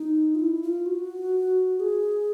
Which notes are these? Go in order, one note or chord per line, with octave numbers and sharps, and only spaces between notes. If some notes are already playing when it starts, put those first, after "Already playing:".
Already playing: D#4
F4
E4
F4
F#4
G#4